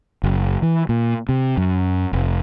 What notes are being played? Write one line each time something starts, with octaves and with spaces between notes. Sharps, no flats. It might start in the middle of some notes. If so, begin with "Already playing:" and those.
F#1
E3
A#2
C3
F#2
F1